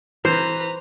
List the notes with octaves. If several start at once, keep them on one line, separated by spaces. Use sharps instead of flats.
E3 B4 C5 A#5